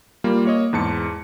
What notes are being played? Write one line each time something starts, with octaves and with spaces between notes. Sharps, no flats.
G3 A#3 F4
A#3 C#5 D#5
E2 G#2 A5 C#7